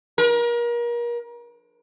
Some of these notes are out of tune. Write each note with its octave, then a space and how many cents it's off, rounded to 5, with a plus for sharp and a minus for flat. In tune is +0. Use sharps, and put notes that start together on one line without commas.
A#4 +35